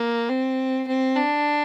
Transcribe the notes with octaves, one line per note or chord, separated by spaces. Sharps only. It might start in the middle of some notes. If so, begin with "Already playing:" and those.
Already playing: A#3
C4
C4
D4